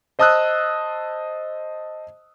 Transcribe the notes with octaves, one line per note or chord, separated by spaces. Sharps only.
C5 D#5 A5 D#6 E6 F#6